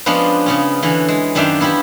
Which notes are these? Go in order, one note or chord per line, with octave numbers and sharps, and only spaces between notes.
F3 G#3 B3 C#4 D4 F4
C#3 B3 C#4
D3 E3 C#4
G#3
F#2 D#3 D4 E5 F5 G5
B3 E4 F4 G4